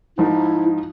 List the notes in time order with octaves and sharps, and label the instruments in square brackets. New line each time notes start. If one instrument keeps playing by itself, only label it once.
[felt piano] G#2 F3 D#4 [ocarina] E4